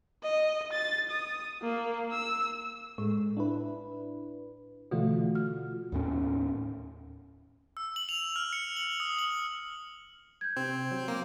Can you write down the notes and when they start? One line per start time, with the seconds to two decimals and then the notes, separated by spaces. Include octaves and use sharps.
0.23 D#5
0.73 A6
1.10 D#6
1.62 A#3
2.12 E6
2.98 A2 G#3
3.37 D4 E4 B4
4.91 B2 D3 E3 A3 F4 F#4
5.35 F6
5.92 D#2 A2 C#4
7.77 E6
7.96 F#7
8.09 F7
8.36 F6
8.53 C#7
8.77 F#7
9.00 D#6
9.19 F#7
10.41 G6 G#6
10.57 C3 C4
10.91 F#3
11.08 A#3